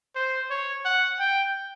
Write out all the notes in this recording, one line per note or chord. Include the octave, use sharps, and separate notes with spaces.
C5
C#5
F#5
G5